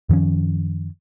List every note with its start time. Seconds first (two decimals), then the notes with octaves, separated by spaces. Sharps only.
0.09 F#2 D#3 F3 C#4